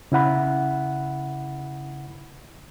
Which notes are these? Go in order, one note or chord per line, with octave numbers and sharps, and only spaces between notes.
C#3 E4 F#5 B5